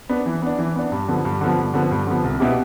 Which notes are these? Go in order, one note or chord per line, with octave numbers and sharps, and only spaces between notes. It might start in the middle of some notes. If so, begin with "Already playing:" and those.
B3 D4
E3
B3 D4
E3
B3 D4
G2
D3 F3 B3
G2
D3 F3 B3
G2
D3 F3 B3
G2
D3 F3 B3
C2
B2 B3 E4 G4